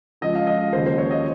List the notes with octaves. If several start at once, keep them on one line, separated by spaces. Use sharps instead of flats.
C#2 C#3 F3 D#5
F5
D#5
D#2 C#3 F3 C5
C5
C#5
D#5